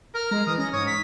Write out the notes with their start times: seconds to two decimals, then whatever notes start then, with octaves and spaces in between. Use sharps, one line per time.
0.15 A#4 F6
0.31 G#3 A#5
0.47 E3 D#6
0.58 C#4 A#6
0.73 G#2 C#5 D#6
0.87 B6